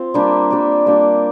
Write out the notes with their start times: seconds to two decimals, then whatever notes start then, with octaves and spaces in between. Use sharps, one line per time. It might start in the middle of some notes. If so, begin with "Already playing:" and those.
Already playing: C4 F4
0.14 G3 A#3 D4 G4
0.51 G3 A#3 D4 G4
0.86 G3 A#3 D4 G4